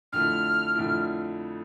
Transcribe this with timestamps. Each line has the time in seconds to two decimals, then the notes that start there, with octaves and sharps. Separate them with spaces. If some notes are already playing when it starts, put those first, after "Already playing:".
0.12 F2 D3 A3 E4 F6
0.75 F2 D3 A3 E4